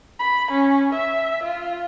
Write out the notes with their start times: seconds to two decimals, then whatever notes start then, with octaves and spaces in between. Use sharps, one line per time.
0.19 B5
0.51 C#4
0.93 E5
1.43 F4